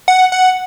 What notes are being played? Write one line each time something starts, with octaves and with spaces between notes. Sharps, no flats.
F#5
F#5